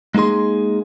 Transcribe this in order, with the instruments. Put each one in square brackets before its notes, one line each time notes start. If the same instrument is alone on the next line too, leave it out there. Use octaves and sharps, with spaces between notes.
[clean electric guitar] G#3 A#3 D#4 G#4 C6